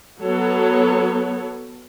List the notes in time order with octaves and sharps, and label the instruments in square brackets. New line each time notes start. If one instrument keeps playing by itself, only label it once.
[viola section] F#3 B3 A4 C#5